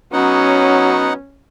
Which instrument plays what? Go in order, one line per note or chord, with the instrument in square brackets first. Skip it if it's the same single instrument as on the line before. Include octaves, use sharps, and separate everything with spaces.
[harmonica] F#3 B3 [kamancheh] C#4 [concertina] D#4 F#5